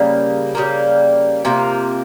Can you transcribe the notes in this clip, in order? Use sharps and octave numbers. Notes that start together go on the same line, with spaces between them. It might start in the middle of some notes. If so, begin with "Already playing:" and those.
Already playing: C#3 G3 A#3
C#3 G3 A#3
C3 F3 A#3